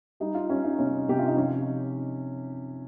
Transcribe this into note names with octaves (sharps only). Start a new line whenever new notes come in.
G3 D#4
F4
G3 C#4
D#4
C3 C#4
C3 G4
F4
D#4
F3 C#4